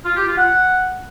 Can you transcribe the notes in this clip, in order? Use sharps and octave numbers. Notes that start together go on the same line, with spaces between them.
F4
G4
F4
F#5